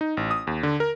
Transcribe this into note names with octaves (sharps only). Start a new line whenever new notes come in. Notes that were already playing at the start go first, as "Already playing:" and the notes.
D#4
A1
D#6
D#2
D3
A#4